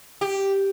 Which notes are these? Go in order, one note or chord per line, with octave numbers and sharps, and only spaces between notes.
G4